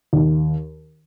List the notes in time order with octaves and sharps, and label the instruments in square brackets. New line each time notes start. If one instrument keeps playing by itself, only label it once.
[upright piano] D#2